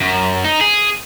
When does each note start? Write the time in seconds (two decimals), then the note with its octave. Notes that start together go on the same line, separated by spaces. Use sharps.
0.01 F#2
0.45 D#4
0.61 G#4